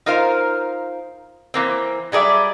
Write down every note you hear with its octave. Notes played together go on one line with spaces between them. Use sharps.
D#4 F4 A#4 C5 F5
E3 A#3 C4
F#3 G3 G#4 D5 E5